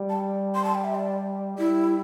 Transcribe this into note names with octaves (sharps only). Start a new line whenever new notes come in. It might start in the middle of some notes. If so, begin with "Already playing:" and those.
Already playing: G3
A5
C6
A5
G5
E5
D5
G3 E4